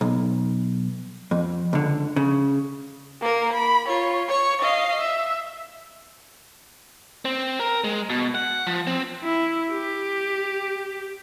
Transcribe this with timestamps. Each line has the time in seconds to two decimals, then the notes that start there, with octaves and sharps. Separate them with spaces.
0.01 B1
1.31 F2
1.73 C#2 D3
2.16 C#3
3.22 A#3 A#4
3.53 B5
3.88 F4 C#5
4.28 C#5 C#6
4.61 D#5 F5
5.01 E5
7.25 C4
7.59 A#4
7.84 G#3
8.10 B2
8.35 F#5
8.67 F3
8.87 C4
9.25 E4
9.72 G4